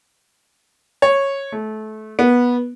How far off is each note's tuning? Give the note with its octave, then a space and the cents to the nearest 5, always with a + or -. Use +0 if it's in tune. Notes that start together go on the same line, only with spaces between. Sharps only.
C#5 -10
A3 -25
B3 -15